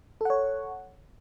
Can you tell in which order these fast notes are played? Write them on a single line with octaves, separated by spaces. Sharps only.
A4 F#5 C#5